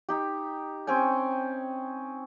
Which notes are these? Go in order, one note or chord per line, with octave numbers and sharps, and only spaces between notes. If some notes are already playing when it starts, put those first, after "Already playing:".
D#4 G4
C4 C#4 G5 G#5